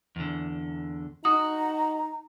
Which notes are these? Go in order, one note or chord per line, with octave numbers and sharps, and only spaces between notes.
E2 D3
D#4 F#4 A#5 D#6